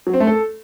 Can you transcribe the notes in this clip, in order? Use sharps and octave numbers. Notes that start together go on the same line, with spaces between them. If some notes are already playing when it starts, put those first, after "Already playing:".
F#3
C4
A3
A4